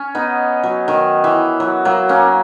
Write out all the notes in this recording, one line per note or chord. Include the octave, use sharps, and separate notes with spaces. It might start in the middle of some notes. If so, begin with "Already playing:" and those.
Already playing: C#4
B3 D#4
F#3
D#3
E3
F#3
F#3 A#3
A#3 C#4